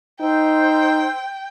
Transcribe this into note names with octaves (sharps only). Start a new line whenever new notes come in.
D#4 C5 G5 E6